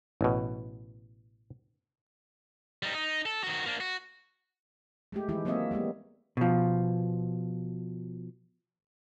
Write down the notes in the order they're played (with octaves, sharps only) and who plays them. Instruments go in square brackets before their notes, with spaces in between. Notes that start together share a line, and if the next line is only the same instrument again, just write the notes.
[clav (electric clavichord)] A1 B2
[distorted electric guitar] G3 D#4
D#4
A4
D#3 F#4
A#3 D4
F#4
[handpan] G#3 A3 G4
D#3 E3 G#3 E4 G4
F#3 A#3 C4 C#5 D#5 E5
G3 G#3 A#3 B3
[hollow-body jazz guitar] B2 F3